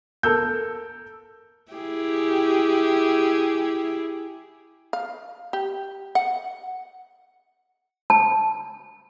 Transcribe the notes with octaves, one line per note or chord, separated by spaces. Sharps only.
A4 A#4 E6 G6
E4 G4 G#4
F5
G4
F#5
A5